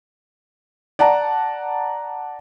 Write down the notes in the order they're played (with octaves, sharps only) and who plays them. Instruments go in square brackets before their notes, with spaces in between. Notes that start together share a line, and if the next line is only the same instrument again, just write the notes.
[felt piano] D5 F#5 A5 A#5